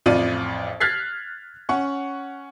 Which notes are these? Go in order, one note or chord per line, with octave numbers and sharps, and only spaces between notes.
A1 F2 F4 D5 D#7
F6 F#6 G#6 A6 B6 C7
C#4 F#5 C#6